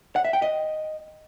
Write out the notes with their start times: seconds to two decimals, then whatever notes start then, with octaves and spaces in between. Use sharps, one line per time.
0.16 F#5
0.25 E5
0.33 G5
0.42 D#5